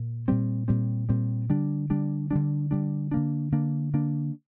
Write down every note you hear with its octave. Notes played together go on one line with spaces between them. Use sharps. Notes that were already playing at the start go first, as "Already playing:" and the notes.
Already playing: A#2
A#2 G3 C4
A#2 G3 C4
A#2 G3 C4
D3 G3 D4
D3 G3 D4
D3 G3 D4
D3 G3 D4
D3 A#3 D4
D3 A#3 D4
D3 A#3 D4